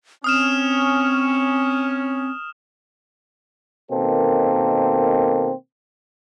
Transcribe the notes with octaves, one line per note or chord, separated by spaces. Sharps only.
C4 C#4 D#6 F6 E7
B2 D#3 A#3 C4 A4